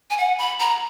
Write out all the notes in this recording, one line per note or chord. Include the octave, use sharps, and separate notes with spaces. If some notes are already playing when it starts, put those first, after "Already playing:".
G#5
F#5
B5
A#5